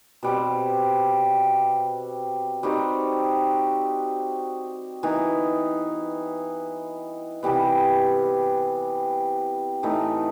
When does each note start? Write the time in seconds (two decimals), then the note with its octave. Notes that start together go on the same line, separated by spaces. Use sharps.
0.23 B2 G3 C4
2.63 G3 C4 D#4 F#4
5.03 E3 B3 D#4
7.43 C3 E3 G3 B3
9.83 A2 E3 A3 D#4